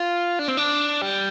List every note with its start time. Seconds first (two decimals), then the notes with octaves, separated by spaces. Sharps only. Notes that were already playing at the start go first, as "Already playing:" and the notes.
Already playing: F4
0.39 D4
0.48 C4
0.57 D4
1.02 G3